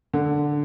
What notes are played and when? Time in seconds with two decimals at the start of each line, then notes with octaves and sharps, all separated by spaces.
0.14 D3